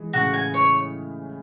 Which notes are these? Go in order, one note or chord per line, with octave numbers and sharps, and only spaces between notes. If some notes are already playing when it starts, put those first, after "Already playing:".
Already playing: E3 G#3
A2 C#3 F#4
G#5
C#5